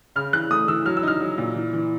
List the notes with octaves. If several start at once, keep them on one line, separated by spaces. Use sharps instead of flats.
C#3 F6
E3 F#6
A3 D#6
E3 E6
F#3 F6
E6
D#4 F6
F#3
A#2
E3
E3